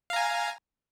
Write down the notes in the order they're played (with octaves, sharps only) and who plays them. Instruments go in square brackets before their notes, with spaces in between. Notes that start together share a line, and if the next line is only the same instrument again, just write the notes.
[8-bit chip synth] F5
A#5
G#5